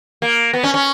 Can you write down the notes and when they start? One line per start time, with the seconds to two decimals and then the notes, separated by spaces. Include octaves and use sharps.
0.22 A#3
0.54 B3
0.64 C#4
0.74 C#4